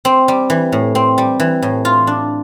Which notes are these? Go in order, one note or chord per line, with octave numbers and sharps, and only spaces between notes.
C4
G3
E3
A2
C4
G3
E3
A2
F4
D4